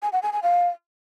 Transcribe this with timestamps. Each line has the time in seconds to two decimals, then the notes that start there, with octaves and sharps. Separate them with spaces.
0.02 G#5
0.13 F#5
0.23 G#5
0.33 G#5
0.43 F5